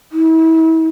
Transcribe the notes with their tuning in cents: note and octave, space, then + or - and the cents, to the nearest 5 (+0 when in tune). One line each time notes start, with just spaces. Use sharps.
E4 -35